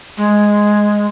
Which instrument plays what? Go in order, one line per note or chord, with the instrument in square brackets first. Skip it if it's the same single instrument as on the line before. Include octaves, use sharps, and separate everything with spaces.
[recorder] G#3